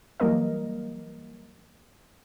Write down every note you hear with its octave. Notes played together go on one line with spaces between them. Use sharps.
E3 F#3 G3 A#3 A#4 D#5